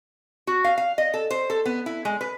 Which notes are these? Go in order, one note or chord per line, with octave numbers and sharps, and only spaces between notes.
F#4
F5
F5
D#5
A4
C5
A4
B3
E4
G#3
B4